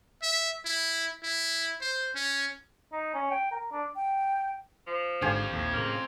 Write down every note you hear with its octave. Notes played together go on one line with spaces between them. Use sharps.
E5
E4
E4
C5
C#4
D#4
C#4
G5
A#4
D4
G5
F3
G#1 G#2 D3 C4 G4 C5 F5 G#5
A#1 D#2 A2
A2 C#3 A#3